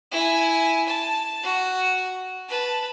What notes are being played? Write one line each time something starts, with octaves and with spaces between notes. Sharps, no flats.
E4 G#5
A5
F#4
B4 A5